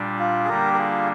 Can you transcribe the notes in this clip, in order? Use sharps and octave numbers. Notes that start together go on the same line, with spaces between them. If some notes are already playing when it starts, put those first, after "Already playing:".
Already playing: A#2 G3 D4
F4
G#4
D3 G3 A#3 D4 G4 A#4
A#4
F4 G#4